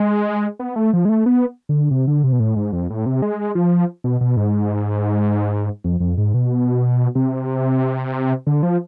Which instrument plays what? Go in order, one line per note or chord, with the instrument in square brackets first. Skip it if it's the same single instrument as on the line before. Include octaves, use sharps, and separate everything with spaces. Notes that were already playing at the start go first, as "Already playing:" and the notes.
Already playing: [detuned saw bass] G#3
B3
A3
F3
G#3
A3
B3
D3
C3
D3
C3
B2
A2
G#2
F2
A2
C3
G#3
F3
B2
B2
G#2
F2
F2
G#2
B2
C3
D3
F3